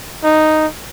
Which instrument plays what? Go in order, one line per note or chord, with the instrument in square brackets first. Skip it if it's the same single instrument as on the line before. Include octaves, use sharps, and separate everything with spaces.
[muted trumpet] D#4